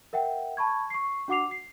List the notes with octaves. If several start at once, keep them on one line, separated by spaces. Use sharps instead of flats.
A#4 E5 F#5 G5
A5 B5 C#6 G#6
C#6 C7
D4 F#4 F#5 D6 C7 F7
C7